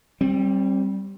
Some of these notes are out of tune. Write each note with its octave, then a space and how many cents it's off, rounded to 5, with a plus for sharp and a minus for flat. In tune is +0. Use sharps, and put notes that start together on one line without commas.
G3 -10 C4 +30